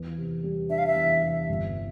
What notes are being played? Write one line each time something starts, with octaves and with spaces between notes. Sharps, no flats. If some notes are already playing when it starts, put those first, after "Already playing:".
Already playing: E2
C3
G3
D4 E5
F5
E5
E2
C3
G1